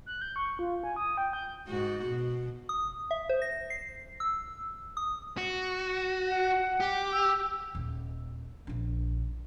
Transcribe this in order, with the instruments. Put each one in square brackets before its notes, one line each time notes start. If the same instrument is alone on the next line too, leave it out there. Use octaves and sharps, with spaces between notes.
[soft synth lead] F#6
G6
C#6
F4
G#5
D#6
G5
G6
[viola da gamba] G#2 F#4
B2
[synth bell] D#6
E5
C5
A#6
C7
E6
D#6
[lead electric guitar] F#4
[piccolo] F#5
[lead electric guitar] G4
[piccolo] E6
[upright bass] D#1
A#1 D4